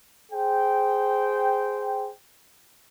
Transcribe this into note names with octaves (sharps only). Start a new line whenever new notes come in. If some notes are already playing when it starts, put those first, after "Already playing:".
G#4 C5 G5